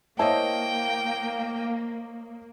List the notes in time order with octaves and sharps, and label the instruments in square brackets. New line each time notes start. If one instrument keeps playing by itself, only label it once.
[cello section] A#3 [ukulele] E4 A5 [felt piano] C5 C#5 D#5 [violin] G5